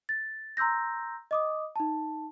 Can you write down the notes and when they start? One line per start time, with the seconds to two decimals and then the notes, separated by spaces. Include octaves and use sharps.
0.09 A6
0.57 A#5 C6 E6 G6 A#6
1.31 D#5 D6 D#6
1.76 D#4 A5